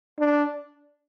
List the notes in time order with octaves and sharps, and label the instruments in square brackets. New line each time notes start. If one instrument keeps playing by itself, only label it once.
[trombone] D4